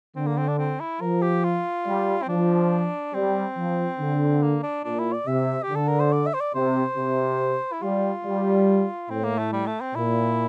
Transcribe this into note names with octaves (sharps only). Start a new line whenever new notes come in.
D3 C4
A#3
C4
D4
C4
E4
F3 A#4
G4
F4
G3
C4
F3 D4
G3 C4
F3
D3
A#3
D4
A#2 D4
E4
D5
C3 E5
G4
D3
A4
A#4
C5
D5
E5
C5
D5
C3 C5
C3
E4
G3 F4
G3
A2 C4
A#3
A3
G3
A3
C4
A#2 E4